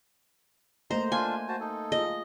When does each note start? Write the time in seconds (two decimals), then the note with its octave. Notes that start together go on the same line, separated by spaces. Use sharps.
0.91 A3 A#3 C5 D#5 A#5
1.12 D4 F4 G#5
1.48 F#4 C5 A5
1.60 D#4 A4
1.92 F4 G#4 D#5